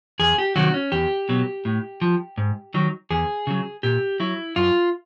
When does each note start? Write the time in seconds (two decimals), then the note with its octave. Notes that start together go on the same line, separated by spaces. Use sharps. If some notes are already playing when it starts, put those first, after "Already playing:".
0.20 E2 G#4
0.38 G4
0.56 C3 D#3 F#3 F#4
0.74 C#4
0.92 E2 G4
1.29 B2 F#3
1.65 A2
2.02 F3
2.38 G#2
2.74 D#3 F#3
3.11 E2 G#4
3.47 C#3 F#3
3.83 A#2 G4
4.20 F#3 E4
4.56 F#2 F4